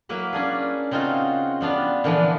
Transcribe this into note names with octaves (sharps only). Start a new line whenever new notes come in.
F#3 A#3 E4 B4
C#4 D4 G#4
C#3 C4 D#4 F4 F#4
G3 B3 D4 F5
A#2 D3 E3 F3